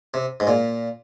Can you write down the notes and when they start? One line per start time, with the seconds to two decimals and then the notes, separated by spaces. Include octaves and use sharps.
0.14 C3
0.40 G#2
0.47 A#2